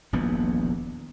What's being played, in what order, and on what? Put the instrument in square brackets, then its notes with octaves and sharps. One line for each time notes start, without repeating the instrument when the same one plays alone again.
[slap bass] D#1 A#1 E2 B3